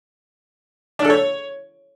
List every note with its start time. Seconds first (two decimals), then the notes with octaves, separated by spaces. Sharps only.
0.99 D4
1.05 A4
1.10 C#5